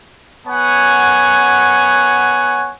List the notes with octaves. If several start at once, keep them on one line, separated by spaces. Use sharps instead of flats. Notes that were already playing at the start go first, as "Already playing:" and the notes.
B3 C#5 F#5 G#5